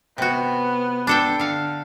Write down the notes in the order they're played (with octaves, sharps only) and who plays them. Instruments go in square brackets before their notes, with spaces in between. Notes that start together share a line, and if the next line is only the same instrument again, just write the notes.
[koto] C3 F#4 [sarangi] B3
[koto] D4 A4 G5
D3 F5